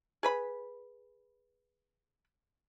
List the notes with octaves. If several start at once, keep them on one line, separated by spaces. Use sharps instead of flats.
G#4 B4 B5